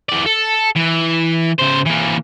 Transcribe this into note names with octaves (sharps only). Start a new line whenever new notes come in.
E3 D5
A4
E3
C#3 C5
E3 A#3